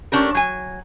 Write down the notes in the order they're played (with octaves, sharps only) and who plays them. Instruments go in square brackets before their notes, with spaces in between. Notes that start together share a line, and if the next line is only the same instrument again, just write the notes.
[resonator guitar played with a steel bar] A3 C#4 D4 G4 A#4
F#3 G#5